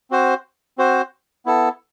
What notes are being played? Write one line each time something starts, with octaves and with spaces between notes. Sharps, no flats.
C4 F#4 C5
C4 F#4 C5
B3 E4 A4